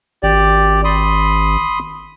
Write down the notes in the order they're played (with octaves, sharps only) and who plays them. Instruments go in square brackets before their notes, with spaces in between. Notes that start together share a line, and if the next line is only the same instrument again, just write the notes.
[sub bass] G#1 [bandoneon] G4 D5
[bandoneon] B5 C6 D#6